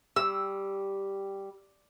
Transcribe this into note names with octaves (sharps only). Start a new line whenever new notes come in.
G3 G4 E6